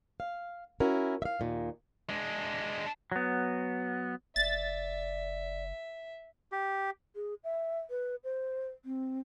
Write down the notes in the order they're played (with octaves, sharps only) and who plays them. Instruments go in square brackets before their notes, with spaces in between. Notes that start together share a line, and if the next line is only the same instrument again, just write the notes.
[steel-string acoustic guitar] F5
C#4 E4 F#4 A#4
E5 F5
D#2 A#2 D#3
[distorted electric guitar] G#3 D4
[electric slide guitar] F#3 B3
[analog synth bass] F#1 [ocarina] D5 [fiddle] E5 [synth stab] A6
[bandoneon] G4
[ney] G#4
E5
B4
C5
C4